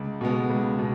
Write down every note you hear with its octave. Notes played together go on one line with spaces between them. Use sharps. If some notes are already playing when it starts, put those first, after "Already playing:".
Already playing: C#2
B2 G#3 B3
C#2
B2